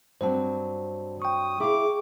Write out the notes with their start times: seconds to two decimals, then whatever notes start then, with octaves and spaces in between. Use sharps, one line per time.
0.21 G2 F#3 C4 C5 A5
1.22 G5 C#6 D#6
1.60 E4 G#4 F5 D6